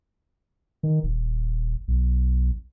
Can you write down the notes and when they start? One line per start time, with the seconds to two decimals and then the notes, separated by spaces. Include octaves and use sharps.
0.83 D#3
1.03 D#1
1.88 B1